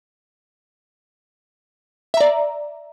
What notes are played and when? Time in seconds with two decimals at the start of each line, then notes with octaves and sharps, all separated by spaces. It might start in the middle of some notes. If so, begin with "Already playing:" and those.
2.14 E5
2.17 A#5
2.21 D5